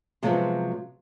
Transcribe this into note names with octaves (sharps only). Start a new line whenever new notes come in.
C3 F3 F#3 G#3 B3 C4